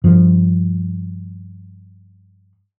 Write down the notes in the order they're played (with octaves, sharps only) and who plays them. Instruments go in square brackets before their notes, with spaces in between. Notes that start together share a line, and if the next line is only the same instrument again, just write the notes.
[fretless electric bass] G2 F3